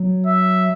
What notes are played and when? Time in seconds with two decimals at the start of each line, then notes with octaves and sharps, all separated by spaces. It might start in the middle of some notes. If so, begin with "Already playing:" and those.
Already playing: F#3
0.27 E5